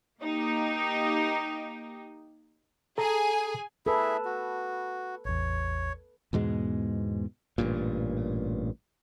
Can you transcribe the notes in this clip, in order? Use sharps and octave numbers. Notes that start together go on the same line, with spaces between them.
A#3 D#4 G4
G#4 A4 G#5 A#5
E4 G#4 A4 B4 E5
F#4
A1 E2 C#5
E2 G#2 B2 G#3
A1 G2 A#2